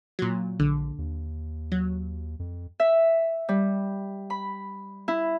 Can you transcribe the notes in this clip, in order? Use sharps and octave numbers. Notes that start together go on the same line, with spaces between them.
A#2 F#3
A#1 D3
D#2
F#3
F2
E5
G3
B5
E4